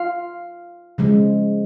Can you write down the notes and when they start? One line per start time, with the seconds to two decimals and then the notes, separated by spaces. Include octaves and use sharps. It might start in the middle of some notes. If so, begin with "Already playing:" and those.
Already playing: F4 F5
0.98 C#3 F3 G#3